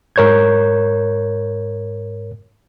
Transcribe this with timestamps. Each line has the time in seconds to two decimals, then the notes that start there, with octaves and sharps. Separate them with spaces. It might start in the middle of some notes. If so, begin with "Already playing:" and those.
0.16 G#2 A#4 C#5 G6 G#6